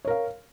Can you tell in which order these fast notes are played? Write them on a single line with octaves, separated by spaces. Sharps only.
C#5 A#4 F5